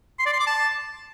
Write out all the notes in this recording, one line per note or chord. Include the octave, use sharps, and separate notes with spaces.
C6
D5
C6
D6
A5